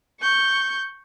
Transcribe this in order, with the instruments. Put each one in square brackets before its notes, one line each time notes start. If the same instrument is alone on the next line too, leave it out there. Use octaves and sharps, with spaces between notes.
[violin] C#6 G6